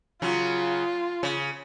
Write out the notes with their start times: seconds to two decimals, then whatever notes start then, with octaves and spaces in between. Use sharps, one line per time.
0.22 C#3 F#3 F4
1.23 C#3